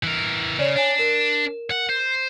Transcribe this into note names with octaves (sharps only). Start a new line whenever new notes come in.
E3 A#4
C#3 C#5 D5
D4 C#5 G#5
A#4 E7
F#5
C5